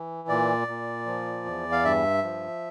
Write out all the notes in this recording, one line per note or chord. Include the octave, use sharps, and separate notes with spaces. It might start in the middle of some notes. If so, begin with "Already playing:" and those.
Already playing: E3
A#2 D5
A#2
F3
E2
F5
G2 E5
F3